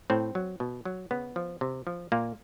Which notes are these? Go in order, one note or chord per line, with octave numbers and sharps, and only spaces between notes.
A2 C4
F#3
B2
F#3
C#3 B3
F3
C3
F3
A#2 A#3